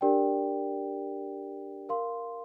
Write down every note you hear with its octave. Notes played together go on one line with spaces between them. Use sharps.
D4 G4 A#4 D5 G5
A#4 F5 C6